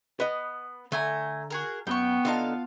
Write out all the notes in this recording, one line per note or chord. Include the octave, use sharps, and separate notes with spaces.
B3 B4 D#5
D3 A3 G#5 A#5
F#4 G#4 A#4
F#2 B3 G5 C#6
D3 D#4 F4 F5 A5